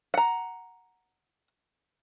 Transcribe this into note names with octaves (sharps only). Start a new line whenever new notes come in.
F#5 A#5